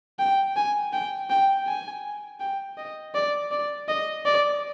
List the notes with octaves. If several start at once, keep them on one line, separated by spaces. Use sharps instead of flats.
G5
G#5
G5
G5
G#5
G5
D#5
D5
D5
D#5
D5